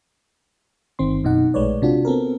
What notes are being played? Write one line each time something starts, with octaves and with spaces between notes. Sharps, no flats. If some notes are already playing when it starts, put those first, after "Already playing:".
G1 D#3 C4 C6
F#2 B2 D#4 F#5
A#1 G#3 A3 B4 C#5 D5
C3 D4 F4 F#4
B3 C4 A4 A#4